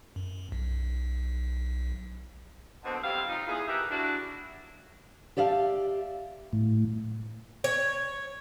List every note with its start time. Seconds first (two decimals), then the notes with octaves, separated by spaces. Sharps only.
0.16 F#2
0.52 B1
2.84 B2 D3 A#3 C4
3.04 F2 G3 C4 E5 F5
3.29 D#4 F4
3.47 E2 E3 B3 G#4
3.67 D#4 E4 G4 A#4 B4 E5
3.90 D4 E4 F#4
5.37 G4 D5 E5 F5 A5
6.53 A2
7.64 C#5